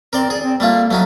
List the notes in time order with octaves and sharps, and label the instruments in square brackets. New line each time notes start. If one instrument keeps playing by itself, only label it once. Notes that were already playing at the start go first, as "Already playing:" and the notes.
[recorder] C4 [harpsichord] A#4 D5 C6
[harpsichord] G#4 [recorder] D5
[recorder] C4
[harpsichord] G3 A3 F4 [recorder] A#3
[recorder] F#3 [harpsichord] A3 C#4 D#4